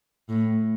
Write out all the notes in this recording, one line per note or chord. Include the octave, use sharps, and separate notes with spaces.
A2